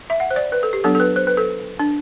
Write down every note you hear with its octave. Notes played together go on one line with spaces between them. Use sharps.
E5
F#5
C5
D5
B4
A4
G4
F#3 B3 D4 A4
A4
B4
C5
B4
A4
D4